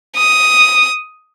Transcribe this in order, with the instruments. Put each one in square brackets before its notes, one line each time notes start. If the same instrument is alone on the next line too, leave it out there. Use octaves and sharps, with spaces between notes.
[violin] D#6